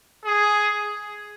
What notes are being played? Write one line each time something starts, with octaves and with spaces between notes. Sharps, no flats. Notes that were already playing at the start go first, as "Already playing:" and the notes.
G#4